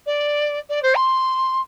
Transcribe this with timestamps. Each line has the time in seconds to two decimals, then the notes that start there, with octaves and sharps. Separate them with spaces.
0.06 D5
0.69 D5
0.82 C5
0.95 C6